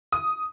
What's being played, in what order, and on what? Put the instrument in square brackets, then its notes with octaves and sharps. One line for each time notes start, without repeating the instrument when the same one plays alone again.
[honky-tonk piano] D#6